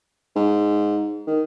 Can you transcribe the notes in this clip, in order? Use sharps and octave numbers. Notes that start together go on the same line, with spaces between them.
G#2
D#3